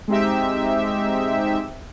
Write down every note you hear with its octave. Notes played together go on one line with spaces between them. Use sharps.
G#3 C4 D#4 G4 E5